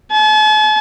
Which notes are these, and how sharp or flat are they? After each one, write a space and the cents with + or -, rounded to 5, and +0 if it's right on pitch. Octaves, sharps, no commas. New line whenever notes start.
A5 -45